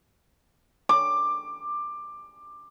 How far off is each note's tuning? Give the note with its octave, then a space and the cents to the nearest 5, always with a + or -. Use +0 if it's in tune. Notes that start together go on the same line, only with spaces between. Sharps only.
D6 +15